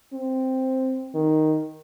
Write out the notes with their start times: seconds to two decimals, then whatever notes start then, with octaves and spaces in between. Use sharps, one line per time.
0.13 C4
1.14 D#3